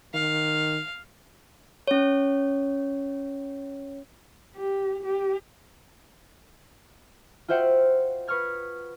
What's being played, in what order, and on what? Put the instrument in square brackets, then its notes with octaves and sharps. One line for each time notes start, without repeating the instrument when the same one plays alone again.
[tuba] D#3 [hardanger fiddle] F5
[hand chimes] C#4 C#5
[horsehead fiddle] G4
G4
[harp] F4 F#4 C5 E5 F#5 G5
B4 C#6 D#6 F6 G#6